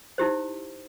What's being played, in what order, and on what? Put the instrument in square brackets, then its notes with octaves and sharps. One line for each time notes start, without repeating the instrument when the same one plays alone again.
[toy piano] D#4 E4 G4 C5